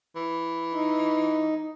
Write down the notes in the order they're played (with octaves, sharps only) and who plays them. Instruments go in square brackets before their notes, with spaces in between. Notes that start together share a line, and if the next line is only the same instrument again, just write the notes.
[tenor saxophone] E3
[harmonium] D#4